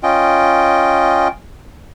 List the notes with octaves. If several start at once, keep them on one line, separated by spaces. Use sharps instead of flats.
C#4 F4 D#5 G5